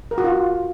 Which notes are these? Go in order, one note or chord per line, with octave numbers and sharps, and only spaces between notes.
A#4
F#4
F4